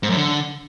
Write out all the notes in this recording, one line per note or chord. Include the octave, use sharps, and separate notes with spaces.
G#2
F#2
D3